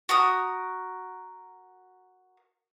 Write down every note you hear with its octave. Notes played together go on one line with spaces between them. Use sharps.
F#4 A#4 D#6